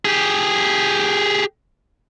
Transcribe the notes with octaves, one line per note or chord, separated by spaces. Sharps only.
G4 G#4